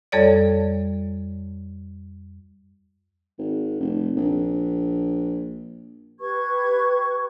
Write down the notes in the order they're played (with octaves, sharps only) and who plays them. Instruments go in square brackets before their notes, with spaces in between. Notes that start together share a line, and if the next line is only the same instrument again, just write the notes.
[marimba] F2 G3 A4 C#5 D5
[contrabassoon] G#1
F1
A#1
[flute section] G4 B4 C#6 G#6